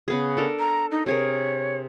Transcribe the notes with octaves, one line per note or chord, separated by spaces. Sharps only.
C#3 B3 G#4
D4 A4 A#4
A#5
D#4
C3 G#4 A#4 C#5